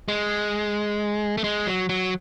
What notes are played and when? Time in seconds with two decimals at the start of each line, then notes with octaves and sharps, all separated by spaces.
0.08 G#3
1.37 A3
1.44 G#3
1.67 F#3
1.89 F#3